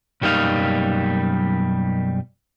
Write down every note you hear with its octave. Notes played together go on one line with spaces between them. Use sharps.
B1 F#2 G3 A#3 D#4 F5